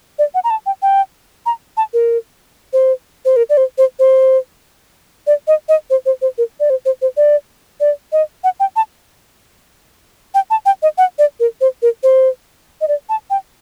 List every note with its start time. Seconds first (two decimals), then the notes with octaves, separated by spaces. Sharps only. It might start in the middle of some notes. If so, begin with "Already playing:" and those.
0.19 D5
0.35 F#5
0.44 A#5
0.50 A5
0.66 G5
0.82 G5
1.46 A#5
1.77 A5
1.94 A#4
2.73 C5
3.25 C5
3.36 A#4
3.49 D5
3.57 C5
3.78 C5
3.99 C5
5.27 D5
5.47 D#5
5.69 D#5
5.90 C5
6.06 C5
6.22 C5
6.38 A#4
6.60 D5
6.70 C5
6.85 C5
7.02 C5
7.17 D5
7.80 D5
8.12 D#5
8.44 F#5
8.60 G5
8.76 A5
10.34 G5
10.50 A5
10.66 G5
10.82 D#5
10.98 F#5
11.19 D5
11.40 A#4
11.61 C5
11.82 A#4
12.03 C5
12.81 D#5
12.88 D5
13.09 A5
13.30 G5